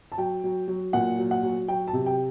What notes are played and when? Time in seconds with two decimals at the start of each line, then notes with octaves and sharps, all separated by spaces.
0.12 A5
0.18 F#3 G5
0.44 F#3
0.68 F#3
0.93 A#2 F#5
1.18 F#3
1.31 F#5
1.43 F#3
1.68 F#3 G5
1.88 A5
1.93 C3
2.06 G5